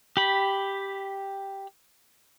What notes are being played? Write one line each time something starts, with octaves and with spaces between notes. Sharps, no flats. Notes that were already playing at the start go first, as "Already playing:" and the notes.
G4 B5